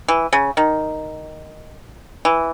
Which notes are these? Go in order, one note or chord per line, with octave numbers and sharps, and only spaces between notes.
E3
C#3
D#3
E3